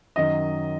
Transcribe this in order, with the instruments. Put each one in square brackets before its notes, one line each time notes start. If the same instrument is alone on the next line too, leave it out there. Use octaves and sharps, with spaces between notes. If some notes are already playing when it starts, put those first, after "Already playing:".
[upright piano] F#2 D#3 F#3 D#5